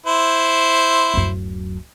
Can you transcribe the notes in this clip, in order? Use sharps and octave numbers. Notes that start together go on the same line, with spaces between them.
E4 C5
D1 F#2